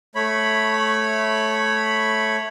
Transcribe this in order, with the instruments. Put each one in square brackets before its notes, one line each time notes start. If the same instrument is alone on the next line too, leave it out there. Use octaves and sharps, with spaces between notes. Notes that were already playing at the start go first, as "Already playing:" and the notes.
[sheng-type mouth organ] A3 C#5 B5